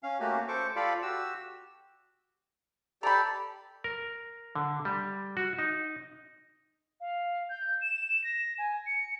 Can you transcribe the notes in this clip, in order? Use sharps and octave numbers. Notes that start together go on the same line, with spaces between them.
C#4 F5
A3 A#3 C#4 F#4 G4
A4 C5 C#6 D6
F4 G4 A4 D5 F5 B5
F#4 G4 E6
G4 A4 D5 A#5 B5
A#4
D3
G3
F#4
D#4
F5
G6
E7
A#6
G#5
C#7